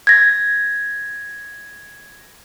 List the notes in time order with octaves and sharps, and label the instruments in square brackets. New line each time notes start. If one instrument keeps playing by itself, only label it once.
[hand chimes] G#6 A#6